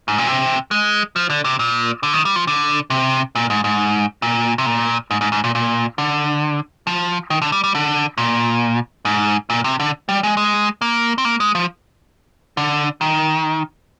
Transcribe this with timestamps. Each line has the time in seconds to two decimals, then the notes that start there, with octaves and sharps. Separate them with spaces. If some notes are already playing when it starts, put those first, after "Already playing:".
0.08 G#2
0.18 A#2
0.27 C3
0.71 G#3
1.16 F3
1.30 D3
1.45 C3
1.59 A#2
2.03 D3
2.13 D#3
2.25 G3
2.36 F3
2.47 D3
2.90 C3
3.35 A#2
3.50 G#2
3.64 G#2
4.22 A#2
4.58 C3
4.66 A#2
5.11 G#2
5.21 G#2
5.32 G#2
5.44 A#2
5.55 A#2
5.98 D3
6.87 F3
7.30 D#3
7.42 D3
7.52 G3
7.64 G3
7.75 D3
8.18 A#2
9.05 G#2
9.50 A#2
9.64 C3
9.80 D3
10.09 G3
10.23 G#3
10.37 G#3
10.82 A#3
11.18 C4
11.25 A#3
11.40 G#3
11.55 F3
12.57 D3
13.01 D#3